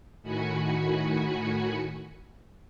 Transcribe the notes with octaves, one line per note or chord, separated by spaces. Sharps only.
A2 D#3 F#4 G#5 B5 C#7